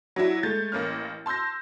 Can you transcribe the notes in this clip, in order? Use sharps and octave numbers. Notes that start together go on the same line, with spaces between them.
F#3 D4 E4
G#3 A3 G6 A6
A1 A#3 C#4 F6
A5 C6 E6 G6 A#6